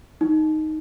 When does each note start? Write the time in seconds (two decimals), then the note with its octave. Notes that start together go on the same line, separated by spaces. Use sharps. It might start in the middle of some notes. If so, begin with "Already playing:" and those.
0.21 D#4